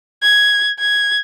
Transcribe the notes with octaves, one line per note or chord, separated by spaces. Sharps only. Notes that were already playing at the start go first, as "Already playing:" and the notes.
G#6
G#6